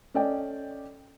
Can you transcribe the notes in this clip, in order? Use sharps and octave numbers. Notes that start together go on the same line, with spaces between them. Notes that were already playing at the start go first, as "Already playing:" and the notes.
C#4 A4 D5 D#5 G5